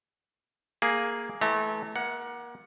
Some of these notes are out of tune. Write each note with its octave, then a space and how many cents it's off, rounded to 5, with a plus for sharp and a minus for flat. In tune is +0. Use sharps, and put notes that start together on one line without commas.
A#3 +0 G#4 +0
E3 -10 A3 -30 A#5 -40
A#3 +30 F#5 +0